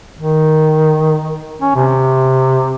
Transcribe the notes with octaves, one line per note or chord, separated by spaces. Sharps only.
D#3
C#4
C3